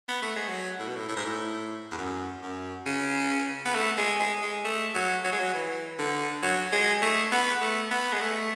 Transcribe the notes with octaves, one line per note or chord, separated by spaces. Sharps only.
B3
A3
G#3
F#3
A2
B2
A2
A2
G#2
A2
E2
F#2
F#2
C#3
B3
A3
G#3
G#3
G#3
A3
F#3
F#3
G#3
F#3
E3
D3
F#3
G#3
A3
B3
A3
B3
G#3
A3